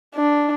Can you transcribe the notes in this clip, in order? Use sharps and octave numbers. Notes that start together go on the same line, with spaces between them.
D4